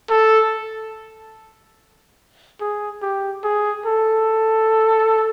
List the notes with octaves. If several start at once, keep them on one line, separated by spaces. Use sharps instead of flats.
A4
G#4
G4
G#4
A4